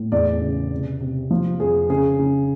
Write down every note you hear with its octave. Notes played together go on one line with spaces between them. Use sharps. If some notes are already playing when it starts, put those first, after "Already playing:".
Already playing: A2
E2 D5
C#3
C3
C3
F3
F2 G#4
C#3 G#4
C#3